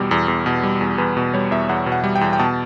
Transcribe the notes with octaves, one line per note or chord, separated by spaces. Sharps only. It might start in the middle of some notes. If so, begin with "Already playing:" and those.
Already playing: E2 B2 G3 G4
E2
E2
B2
G3
E2
E2 B4
B2
G3 C#5
E2 E5
E2 F#5
B2
F#5
G3
G5
E2
G5
B2 A5